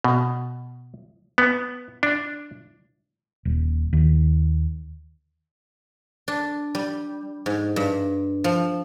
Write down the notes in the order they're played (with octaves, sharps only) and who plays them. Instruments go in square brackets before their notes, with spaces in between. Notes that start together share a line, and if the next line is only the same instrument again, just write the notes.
[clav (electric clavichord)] B2
B3
D4
[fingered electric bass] D#1
D#2
[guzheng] D4
G3
G#2
G2
F3